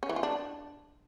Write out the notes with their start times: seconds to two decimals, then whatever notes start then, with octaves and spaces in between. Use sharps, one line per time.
0.03 C#4
0.09 E3
0.16 F4
0.23 D4